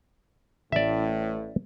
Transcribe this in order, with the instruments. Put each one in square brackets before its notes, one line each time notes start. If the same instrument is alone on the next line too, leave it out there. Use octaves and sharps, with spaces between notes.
[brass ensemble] A1 A2 [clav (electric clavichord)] D5 E5